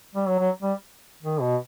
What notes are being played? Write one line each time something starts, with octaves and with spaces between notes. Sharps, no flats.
G3
F#3
F#3
G3
D#3
B2